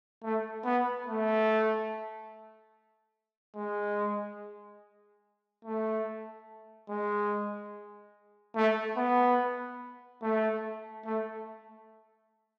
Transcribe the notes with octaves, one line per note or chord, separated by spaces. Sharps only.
A3
B3
A3
G#3
A3
G#3
A3
B3
A3
A3